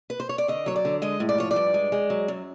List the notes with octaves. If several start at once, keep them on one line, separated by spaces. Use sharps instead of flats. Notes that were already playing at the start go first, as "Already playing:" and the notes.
B4
C5
C#5
D5
D3 D#5
F#3 C#5
D5
D3
G#3 D#5
A2
D5
F3 C#5
D5
G2
G#3
G#3
F#3
F#2